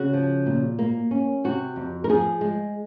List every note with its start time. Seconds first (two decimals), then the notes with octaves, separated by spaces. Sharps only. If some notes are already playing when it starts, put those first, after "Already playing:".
Already playing: C#3 F#4
0.13 F3
0.46 A#2
0.79 A#3
1.11 C#4
1.44 C3 F#4
1.76 F2
2.04 A#4
2.09 F3 G#4
2.41 G#3